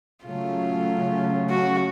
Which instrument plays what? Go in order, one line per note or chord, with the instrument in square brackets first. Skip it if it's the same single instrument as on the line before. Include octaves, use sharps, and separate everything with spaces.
[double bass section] C#3 F#3 A3 C#4 [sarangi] F4
[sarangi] F#4